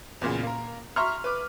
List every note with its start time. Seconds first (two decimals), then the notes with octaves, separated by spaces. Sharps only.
0.21 E2 A#2 C#3
0.43 A#3 A#4
0.96 E5 A#5 C6 C#6 F6
1.24 B4 D6